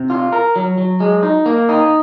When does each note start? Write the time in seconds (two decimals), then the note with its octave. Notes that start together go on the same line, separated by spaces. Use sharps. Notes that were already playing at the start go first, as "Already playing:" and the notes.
Already playing: C3
0.10 F4
0.32 A#4
0.56 F#3
0.78 F#3
1.00 G#3
1.23 D#4
1.46 A#3
1.69 D#4